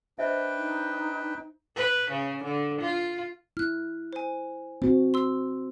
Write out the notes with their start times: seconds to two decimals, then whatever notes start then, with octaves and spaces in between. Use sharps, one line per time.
0.19 D4 B4 C5 D#5 E5 G5
0.57 D#4
1.76 B4
2.11 C#3
2.44 D3
2.82 F4
3.57 E4 F6 F#6
4.13 C5 G#5
4.82 C4 F#4 C5
5.14 C6 E6